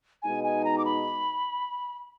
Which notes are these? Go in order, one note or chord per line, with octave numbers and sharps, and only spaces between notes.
B2 G#3 D#4 G#5
G#5
A#5
D6
B5